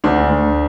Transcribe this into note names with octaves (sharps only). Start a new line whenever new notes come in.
D2 D4
D2